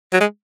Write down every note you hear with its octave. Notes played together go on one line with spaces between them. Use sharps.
F#3
G#3